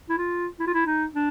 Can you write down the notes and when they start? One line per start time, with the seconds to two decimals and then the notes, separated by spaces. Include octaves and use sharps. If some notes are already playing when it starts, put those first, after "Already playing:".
0.09 E4
0.18 F4
0.60 E4
0.67 F4
0.74 E4
0.86 D#4
1.15 D4